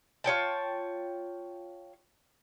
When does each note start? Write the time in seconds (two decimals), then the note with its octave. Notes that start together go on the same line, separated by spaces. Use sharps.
0.24 F4 C#5 G5 A5